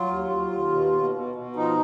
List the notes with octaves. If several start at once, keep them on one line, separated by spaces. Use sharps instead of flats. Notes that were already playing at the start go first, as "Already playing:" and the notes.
Already playing: F#3 F4
D#2
D#2
D#2
B2
B2
B2
B2
F3 D#4